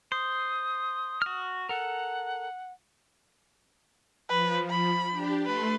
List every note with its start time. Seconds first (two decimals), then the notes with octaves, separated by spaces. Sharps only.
0.12 C5 D#6
1.22 F#4 F6
1.69 A4 A#4 F#5
4.29 F3 B4
4.70 B5
5.11 D4 G4
5.46 A3 B4 C6